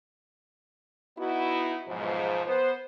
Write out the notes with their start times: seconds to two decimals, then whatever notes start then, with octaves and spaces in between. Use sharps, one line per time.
1.19 B3 D#4 E4 F#4
1.88 B1 G#2 F3
2.46 B3 C5